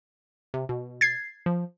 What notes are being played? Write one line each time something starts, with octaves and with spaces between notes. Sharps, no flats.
C3
B2
G#6 A6 C7
F3